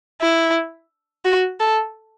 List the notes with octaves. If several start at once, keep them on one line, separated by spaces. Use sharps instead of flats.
E4
F#4
A4